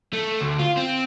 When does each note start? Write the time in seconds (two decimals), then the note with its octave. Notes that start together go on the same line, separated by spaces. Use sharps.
0.13 A3
0.41 D2
0.60 F4
0.77 C4